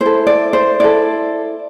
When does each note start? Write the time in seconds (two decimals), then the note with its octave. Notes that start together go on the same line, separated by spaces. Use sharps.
0.01 E4 A4 C5
0.27 D5
0.53 C5
0.80 E4 A4 D5